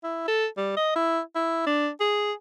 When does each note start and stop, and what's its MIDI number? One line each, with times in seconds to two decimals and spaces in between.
0.03 0.23 64
0.28 0.47 69
0.57 0.72 55
0.77 0.91 75
0.95 1.21 64
1.35 1.63 64
1.66 1.89 62
2.00 2.33 68